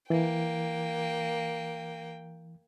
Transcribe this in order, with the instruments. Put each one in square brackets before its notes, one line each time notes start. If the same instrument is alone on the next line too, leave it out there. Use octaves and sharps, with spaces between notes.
[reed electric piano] E3 [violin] A#3 G5